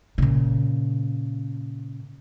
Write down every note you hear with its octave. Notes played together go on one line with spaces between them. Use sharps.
A#2 C#3